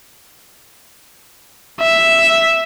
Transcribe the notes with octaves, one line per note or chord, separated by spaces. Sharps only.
E5